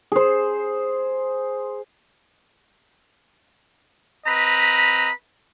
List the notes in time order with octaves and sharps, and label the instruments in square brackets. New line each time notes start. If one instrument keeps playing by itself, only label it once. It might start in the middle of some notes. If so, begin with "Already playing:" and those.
[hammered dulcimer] G#4 C5
[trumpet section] C4 B4 D#5 A#5 B5